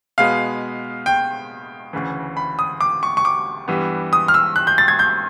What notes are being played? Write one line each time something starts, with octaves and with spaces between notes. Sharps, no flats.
B2 G#3 B3 F5
G5
D2 C#3 E3
B5
D#6
D6
C#6
C#6
D6
G2 E3 G3 B3
D#6
F6
E6
F#6
G6
A6
G#6
G6